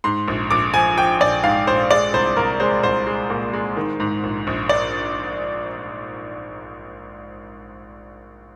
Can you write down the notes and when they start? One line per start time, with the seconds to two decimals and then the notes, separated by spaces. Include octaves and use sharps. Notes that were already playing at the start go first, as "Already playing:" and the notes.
0.04 G#2 C6
0.28 A#1
0.51 A#1 D6
0.74 F3 G#5
0.98 F3 G5
1.20 A#1 D5
1.44 G#2 F5
1.67 A#1 C5
1.90 G#3 D5
2.14 C2 C5
2.37 C2 A#4
2.60 G#3 C5
2.83 C2 C5
3.07 G#3
3.30 A#2
3.53 G#3
3.77 D#3
4.00 G#2
4.23 A#1
4.47 A#1
4.69 D5